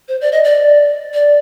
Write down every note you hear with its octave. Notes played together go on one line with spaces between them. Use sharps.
C5
D5
D#5
D5
D5